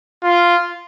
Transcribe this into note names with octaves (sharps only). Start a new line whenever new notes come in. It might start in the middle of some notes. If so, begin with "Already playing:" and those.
F4